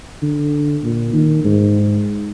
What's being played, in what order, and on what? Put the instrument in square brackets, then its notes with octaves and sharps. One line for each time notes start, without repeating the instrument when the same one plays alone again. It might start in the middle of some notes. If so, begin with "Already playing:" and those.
[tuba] D3
A#2
D#3
G#2